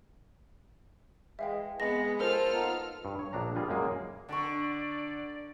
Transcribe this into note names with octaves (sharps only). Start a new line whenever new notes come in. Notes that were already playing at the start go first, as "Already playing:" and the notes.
E3 G#3 E5 F5 G5
G#3 B3 A#6
F4 A4 A#4 C5 F6
A#3 B3 D#4
G2
C#5
A#1 D4 A#5
G3 F4 G#4
F#2 G#3 A#3 G#4
D3 D5 F#5 A#5 C#6